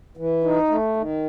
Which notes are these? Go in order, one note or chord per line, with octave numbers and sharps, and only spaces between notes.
E3
D#4
A3
D#3